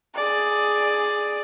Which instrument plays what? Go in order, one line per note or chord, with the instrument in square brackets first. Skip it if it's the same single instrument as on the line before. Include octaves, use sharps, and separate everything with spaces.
[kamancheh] G#4 D5